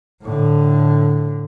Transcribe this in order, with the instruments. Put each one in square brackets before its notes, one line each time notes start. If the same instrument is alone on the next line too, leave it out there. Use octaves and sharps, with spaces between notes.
[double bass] A2 D3